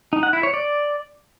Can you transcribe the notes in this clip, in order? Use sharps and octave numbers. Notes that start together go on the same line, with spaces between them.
D#4
F#5
E4
C#5
D5